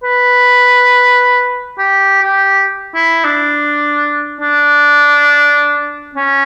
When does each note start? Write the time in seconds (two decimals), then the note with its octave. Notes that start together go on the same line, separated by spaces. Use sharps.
0.04 B4
1.78 G4
2.22 G4
2.95 E4
3.24 D4
4.41 D4
6.15 C#4